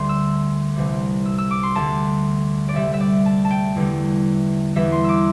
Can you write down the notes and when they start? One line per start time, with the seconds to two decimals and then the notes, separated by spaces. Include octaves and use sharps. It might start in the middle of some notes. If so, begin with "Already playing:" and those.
Already playing: D2 D3 G3 C6
0.09 E6
0.76 C2 C3 E3 G3
1.26 E6
1.38 E6
1.51 D6
1.63 C6
1.75 D2 D3 G3 A5
2.69 D5
2.74 D2 C3 G3 E5
2.94 E5
3.00 D5
3.26 A5
3.45 A5
3.51 G5
3.76 E2 D3 G3
4.75 E2 E3 G3 E5
4.92 C6
5.04 D6 E6